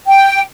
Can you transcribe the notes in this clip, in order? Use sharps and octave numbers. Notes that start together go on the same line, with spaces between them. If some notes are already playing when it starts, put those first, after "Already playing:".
G5